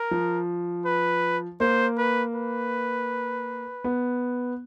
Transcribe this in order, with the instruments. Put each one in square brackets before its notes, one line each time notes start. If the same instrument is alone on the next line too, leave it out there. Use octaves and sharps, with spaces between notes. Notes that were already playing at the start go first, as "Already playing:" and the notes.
Already playing: [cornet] A#4
[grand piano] F3
[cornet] B4
[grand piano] A#3 [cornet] C5
[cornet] B4
B4
[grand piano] B3